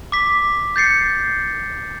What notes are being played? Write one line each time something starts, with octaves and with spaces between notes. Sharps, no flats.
D6 B6
G6 A6 C7 C#7